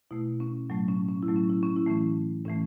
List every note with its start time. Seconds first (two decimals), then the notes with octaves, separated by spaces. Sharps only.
0.11 B2 A3 E4
0.40 C#4
0.70 A2 F#3 A3
0.88 C#4
1.09 C#4
1.23 E4
1.28 A2 F#3 A3
1.36 C#4
1.50 E4
1.63 C#4
1.76 E4
1.86 A2 E3 A3 C#4
2.45 A2 E3 A3 C#4